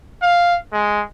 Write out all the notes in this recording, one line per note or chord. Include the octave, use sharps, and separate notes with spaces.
F5
G#3